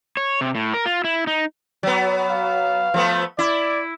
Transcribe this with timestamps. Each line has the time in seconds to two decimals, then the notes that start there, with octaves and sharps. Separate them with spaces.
0.17 C#5
0.41 C3
0.55 A2
0.74 A#4
0.86 F4
1.04 E4
1.27 D#4
1.83 F#3 B3
2.29 F5
2.94 F3 A3 B3
3.39 E4 D5